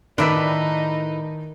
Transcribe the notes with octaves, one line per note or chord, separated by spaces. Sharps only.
A2 D#3 D#4 A#4 B4 D5 E5 B6